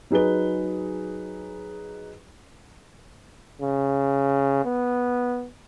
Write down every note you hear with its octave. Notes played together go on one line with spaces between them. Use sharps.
F#3 D#4 G#4 B4 G7
C#3
B3